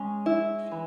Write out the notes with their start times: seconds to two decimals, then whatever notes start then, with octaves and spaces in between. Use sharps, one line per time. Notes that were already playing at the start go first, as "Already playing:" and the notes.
Already playing: G#3 C#4
0.26 E4
0.72 E3